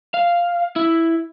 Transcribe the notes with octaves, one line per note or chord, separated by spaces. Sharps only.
F5
E4